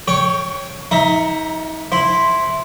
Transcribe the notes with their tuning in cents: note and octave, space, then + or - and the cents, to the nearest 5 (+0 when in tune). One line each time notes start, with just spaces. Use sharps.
C#5 -5 G5 +0 C#6 +35
D#4 +35 E5 +0 A#5 +0
E4 +0 C5 +0